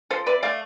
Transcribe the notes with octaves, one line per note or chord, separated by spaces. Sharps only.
F3 A4 C5
C3 B4 D5
A3 D5 F5